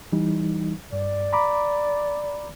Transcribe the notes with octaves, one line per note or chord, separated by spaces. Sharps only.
E3 G3 D#4
G2 D5
A#5 B5 D6